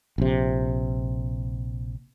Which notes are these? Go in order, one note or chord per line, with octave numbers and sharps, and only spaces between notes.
A#1 C3